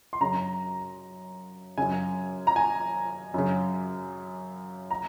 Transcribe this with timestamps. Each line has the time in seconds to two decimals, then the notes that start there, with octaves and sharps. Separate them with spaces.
0.13 C6
0.21 F#2 C#3 A#5
1.78 F#2 C#3 G#5
2.47 A#5
2.56 G#5
3.34 F#2 C#3
4.91 A#5